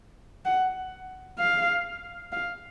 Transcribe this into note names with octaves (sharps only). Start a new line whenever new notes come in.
F#5
F5
F5